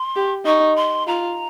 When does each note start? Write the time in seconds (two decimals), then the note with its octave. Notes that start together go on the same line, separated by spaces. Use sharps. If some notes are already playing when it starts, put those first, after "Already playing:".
Already playing: C6
0.16 G4
0.45 D#4 C#6
0.76 C6
1.07 F4 A#5